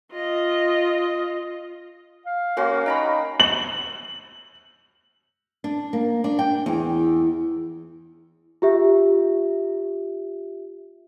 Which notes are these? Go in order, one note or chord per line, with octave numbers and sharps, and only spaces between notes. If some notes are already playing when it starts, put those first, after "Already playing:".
F4 D#5
F5
A#3 C#4 F#4 C6
D#4 G5 A#5 B5
F#7
D4
A#3
D4
G5
E2
F4 G4 E5